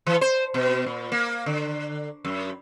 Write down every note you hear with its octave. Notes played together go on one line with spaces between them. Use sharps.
E3
C5
B2
A#2
A#3
D3
F#2